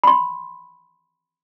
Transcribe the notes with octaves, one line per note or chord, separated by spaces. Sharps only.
B5 C6